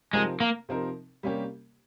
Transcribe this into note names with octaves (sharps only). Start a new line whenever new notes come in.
C3 F3 G#3 C4 D#4 A#4
A#3
C3 F3 C4 D#4 A#4
C3 G3 A#3 C#4 G4